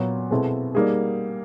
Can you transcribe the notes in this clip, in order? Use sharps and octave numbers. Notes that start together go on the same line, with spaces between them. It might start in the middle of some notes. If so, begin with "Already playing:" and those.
Already playing: A#2 F#3 B3
B2 G#3 C4 E4 A4
G3 A#3 D#4 G#4